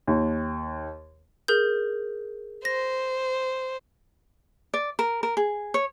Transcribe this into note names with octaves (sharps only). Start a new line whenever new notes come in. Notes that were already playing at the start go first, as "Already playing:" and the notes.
D#2
G#4 A#4 G6
C5 A#6
D5
A#4
A#4
G#4
C#5